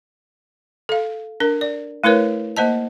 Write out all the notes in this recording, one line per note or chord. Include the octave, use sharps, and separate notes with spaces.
A4 F5
D4 A#4
D5
A3 E4 A#4 B4 C#5
A#3 C5 D#5 A5